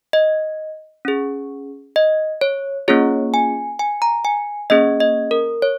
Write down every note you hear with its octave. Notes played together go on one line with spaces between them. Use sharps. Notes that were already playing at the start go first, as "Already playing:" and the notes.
D#5
C#4 G#4
D#5
C#5
A#3 C#4 F4 G#4 C#5
G#5
G#5
A#5
G#5
A#3 C#4 G#4 D#5
D#5
A#4
C#5